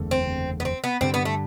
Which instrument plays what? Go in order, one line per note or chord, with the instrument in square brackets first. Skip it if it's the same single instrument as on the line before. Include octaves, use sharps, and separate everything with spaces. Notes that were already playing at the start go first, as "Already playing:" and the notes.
Already playing: [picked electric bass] F#1 E2 D3 A3
[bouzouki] C4
B3
C4
B3
[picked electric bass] G2 D3 G3 [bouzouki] C4
[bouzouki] B3
A3